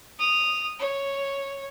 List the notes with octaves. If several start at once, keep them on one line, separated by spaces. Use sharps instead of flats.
D#6 F7
C#5